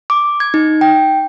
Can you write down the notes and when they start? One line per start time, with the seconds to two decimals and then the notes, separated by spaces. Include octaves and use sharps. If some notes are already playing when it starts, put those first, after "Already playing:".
0.10 D6
0.40 G#6
0.54 D#4
0.81 G5